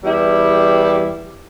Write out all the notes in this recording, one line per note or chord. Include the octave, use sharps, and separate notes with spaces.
E2 G3 E4 G4